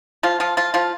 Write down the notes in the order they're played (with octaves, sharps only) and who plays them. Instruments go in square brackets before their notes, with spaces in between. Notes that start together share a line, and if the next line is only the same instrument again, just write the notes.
[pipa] F3 F4
F3 F4
F3 F4
F3 F4